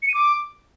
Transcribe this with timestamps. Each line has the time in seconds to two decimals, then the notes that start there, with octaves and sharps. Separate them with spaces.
0.02 C#7
0.08 D#7
0.14 D6